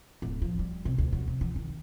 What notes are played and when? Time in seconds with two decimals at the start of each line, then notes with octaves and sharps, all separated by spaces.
0.22 D1
0.42 F3
0.59 G3
0.85 C3
0.98 D2
1.13 F#3
1.27 C3
1.41 E3
1.56 D#3